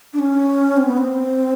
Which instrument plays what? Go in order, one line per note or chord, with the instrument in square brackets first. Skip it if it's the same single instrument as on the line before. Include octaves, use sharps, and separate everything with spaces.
[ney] D4
C#4
C4
B3
C4